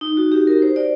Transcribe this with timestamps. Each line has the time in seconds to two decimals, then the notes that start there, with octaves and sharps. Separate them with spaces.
0.01 D#4
0.17 F#4
0.32 G4
0.47 A#4
0.62 C5
0.76 D5